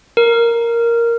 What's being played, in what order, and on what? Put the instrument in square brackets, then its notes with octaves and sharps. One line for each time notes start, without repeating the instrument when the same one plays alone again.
[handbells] A#4